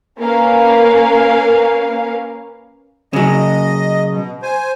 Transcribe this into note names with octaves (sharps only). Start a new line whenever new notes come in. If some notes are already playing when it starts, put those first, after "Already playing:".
A#3 C#4 A#4 B4 F5
C#3 F#3 D#5
B2
C5 G#5